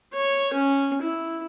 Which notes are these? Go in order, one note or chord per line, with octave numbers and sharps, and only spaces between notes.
C#5
C#4
E4